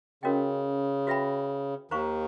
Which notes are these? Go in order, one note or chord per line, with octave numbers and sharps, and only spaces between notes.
C#3 C#4 F#4 A#4 D#5 G5
F#4 B4 E5 G5 B5
D#2 D#3 C5 F5 A#5 C#6